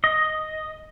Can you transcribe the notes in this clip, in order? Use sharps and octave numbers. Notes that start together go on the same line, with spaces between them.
D#5